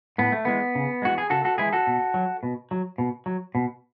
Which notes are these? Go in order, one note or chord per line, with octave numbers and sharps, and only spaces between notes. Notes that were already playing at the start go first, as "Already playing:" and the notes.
A2 B3
A3
E3 G#3 B3
C#3
E3 G#3 F#4
G#4
C#3 F#4 A4
F#4 A4
E3 G#3 E4 G#4
F#4 A4
B2
F#3
B2
F#3
B2
F#3
B2